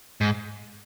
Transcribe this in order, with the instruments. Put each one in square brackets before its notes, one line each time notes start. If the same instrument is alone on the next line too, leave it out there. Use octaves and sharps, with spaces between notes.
[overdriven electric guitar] G#2